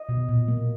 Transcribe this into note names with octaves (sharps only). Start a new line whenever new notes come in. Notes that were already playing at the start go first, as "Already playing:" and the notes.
Already playing: D#5
B2
A#2
A#3